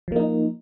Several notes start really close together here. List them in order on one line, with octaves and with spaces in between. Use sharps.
F3 A#3 D#4